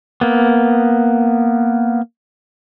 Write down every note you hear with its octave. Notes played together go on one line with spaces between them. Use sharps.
A#3 B3